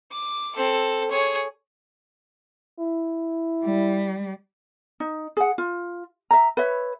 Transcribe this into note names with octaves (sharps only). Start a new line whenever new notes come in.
D6
C4 A4
G#4 C#5
E4
G3
D#4
G#4 F#5
F4
E5 A#5
B4 C#5 E5